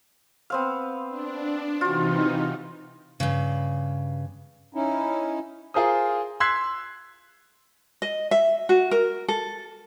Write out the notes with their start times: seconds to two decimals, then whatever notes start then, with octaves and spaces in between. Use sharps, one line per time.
0.50 B3 C4 F5
1.09 D4
1.81 C3 E3 D#4 F4 F#4
3.20 G2 C#3
4.74 C#4 D#4 E4
5.74 F4 G#4 A#4 C5 D#6
6.40 C6 E6 F#6 G#6 B6 C7
8.02 D#5
8.31 E5
8.69 F#4
8.91 A#4
9.28 A4